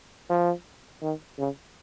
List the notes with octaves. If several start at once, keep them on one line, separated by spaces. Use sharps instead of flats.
F3
D#3
C#3